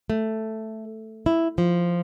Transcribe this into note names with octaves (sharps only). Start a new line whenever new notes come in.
A3
E4
F3